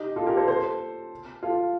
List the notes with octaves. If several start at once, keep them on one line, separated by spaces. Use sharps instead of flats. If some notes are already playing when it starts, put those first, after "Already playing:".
Already playing: D#4 G4
F4 A4
G4 A#4
A4 C5
A4 C5
F4 A4